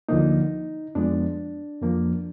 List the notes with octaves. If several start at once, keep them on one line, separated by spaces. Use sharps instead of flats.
D2 D3 F3 A#3 D#4
F2 F3 G#3 B3 D4
F2 F3 A#3